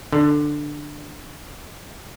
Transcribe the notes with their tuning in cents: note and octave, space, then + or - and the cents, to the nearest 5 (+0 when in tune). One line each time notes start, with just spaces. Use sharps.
D3 +10